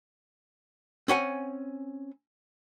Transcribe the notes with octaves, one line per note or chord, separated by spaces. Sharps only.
C4 C#4 F#5 G#5